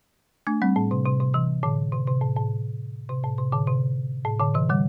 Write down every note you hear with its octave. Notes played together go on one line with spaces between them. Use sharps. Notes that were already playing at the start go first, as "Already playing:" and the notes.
A3 D4
G3 C4
A2
C3
C3
C3
C3 E3
A2 D3
C3
C3
A2
A2
C3
A2
C3
A2 D3
C3
A2
A2 D3
C3 E3
D3 G3